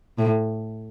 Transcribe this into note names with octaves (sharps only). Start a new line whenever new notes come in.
A2